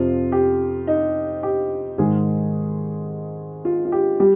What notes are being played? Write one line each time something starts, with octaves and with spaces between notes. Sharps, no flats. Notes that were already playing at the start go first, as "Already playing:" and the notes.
Already playing: F2 C3 F3 F4
G4
D#4
G4
G#2 D#3 G#3 G#4
F4
F4
G4
G3 G4